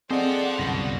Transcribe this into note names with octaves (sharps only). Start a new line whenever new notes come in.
C4 F4 G#4 A4 C5 D5 D#5 F#5
G1 C2 F#2 B2